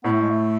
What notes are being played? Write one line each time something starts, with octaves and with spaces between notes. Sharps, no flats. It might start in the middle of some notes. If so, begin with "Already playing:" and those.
A2 B3
A3
G#3
A3